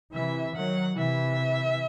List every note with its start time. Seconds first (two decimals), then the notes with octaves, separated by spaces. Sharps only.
0.13 C3 E3 E5
0.56 D#3 F#3 F#5
0.97 C3 E3 E5